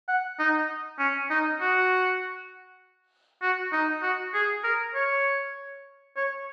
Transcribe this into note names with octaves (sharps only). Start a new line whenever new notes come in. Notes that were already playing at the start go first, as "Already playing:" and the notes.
F#5
D#4
C#4
D#4
F#4
F#4
D#4
F#4
G#4
A#4
C#5
C#5